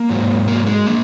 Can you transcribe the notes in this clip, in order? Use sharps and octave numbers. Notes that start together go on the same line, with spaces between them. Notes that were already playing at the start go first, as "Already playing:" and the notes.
Already playing: A#3
G#2 F#3
A#3
G#3
F3 A#3